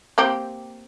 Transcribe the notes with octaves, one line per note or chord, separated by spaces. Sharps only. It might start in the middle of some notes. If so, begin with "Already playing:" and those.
A#3 C4 G4